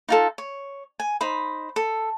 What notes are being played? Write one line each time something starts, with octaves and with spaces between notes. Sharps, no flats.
D#4 F4 A4
C#5
G#5
D#4 C5 B5
A4